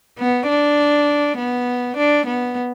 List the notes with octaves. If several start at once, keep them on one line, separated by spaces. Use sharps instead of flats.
B3
D4
B3
D4
B3